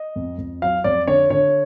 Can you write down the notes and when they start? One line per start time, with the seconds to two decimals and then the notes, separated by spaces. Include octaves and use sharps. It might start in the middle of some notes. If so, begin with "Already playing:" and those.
Already playing: D#5
0.16 F2
0.38 F2
0.62 F#3 F5
0.84 F2 D5
1.07 D3 C#5
1.30 D3 C#5